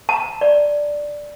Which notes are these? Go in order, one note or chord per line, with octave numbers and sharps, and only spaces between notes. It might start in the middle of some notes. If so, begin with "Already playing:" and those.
A5 A#5
D5